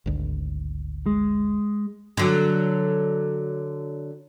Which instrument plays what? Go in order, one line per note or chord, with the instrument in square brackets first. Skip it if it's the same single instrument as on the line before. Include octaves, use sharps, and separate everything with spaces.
[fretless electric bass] G#1 D2
[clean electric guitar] G#3
[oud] D3 F#3